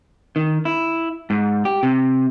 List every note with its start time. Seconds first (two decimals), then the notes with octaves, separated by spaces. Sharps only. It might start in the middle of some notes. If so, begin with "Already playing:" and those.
0.36 D#3
0.65 E4
1.30 G#2
1.65 G4
1.83 C3